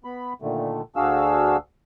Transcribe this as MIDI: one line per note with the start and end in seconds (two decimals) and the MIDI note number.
0.05 0.33 59
0.05 0.33 83
0.42 0.82 46
0.42 0.82 50
0.42 0.82 51
0.42 0.82 57
0.96 1.57 38
0.96 1.57 62
0.96 1.57 66
0.96 1.57 68
0.96 1.57 77
0.96 1.57 88